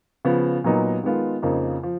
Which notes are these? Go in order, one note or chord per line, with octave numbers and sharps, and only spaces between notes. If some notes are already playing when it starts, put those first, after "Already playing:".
C#3 F3 B3
A#2 F#3 B3 D#4
D#3 G#3 B3 F4
F2 C#3 F3 A#3 D#4
F3